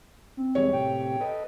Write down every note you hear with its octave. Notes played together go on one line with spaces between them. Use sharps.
C4
E2 G3 G#3 C#5
A2 C3 G4 G5
A4 B4 D#5